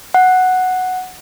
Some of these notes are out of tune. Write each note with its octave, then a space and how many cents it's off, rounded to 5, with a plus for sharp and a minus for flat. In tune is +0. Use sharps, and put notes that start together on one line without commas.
F#5 +0